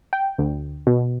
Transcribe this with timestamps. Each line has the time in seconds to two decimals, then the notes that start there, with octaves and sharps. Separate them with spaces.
0.13 G5
0.38 D2
0.87 B2